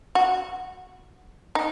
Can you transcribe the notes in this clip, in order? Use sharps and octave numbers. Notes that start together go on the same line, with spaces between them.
F#4
D#4